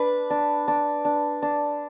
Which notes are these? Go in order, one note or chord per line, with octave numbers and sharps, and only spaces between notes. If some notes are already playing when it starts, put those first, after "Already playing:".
Already playing: D4 B4
D4
D4
D4
D4